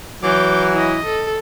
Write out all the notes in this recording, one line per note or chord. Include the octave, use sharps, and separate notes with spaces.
E3 F#3 D6 G6
E4 D#5
A4